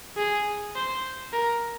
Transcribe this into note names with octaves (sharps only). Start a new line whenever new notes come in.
G#4
C5
A#4